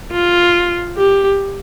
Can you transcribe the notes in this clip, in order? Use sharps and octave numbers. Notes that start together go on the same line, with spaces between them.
F4
G4